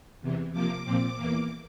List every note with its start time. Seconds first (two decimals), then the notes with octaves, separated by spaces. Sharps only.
0.21 E2 C3 E3
0.53 C3 F3 A#3 D6
0.85 A#2 F3 C4
1.16 E2 E3 A#3